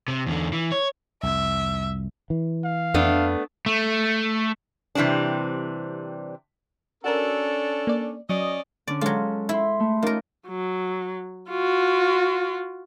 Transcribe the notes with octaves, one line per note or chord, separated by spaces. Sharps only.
C3
E2 D3
E3
C#5
C2 F2 E5
E3
F5
F2 A3 B3 D4
A3
C3 E3 G3 C4 D4
C#4 D4 F#4 A4 A#4
A#3 D5
F#3 C#4 D5 D#5
D3 C#4 D5
F#3 G#3 F4 A4 C#5
E4 B5 C6
A3
A#3 C#4 D#4 F4 A#4
F#3
F4 F#4